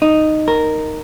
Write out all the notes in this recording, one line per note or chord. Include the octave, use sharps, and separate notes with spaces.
D#4
A#4